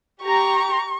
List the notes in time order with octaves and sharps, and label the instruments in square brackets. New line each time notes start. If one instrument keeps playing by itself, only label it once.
[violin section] G4 A#5 [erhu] C#6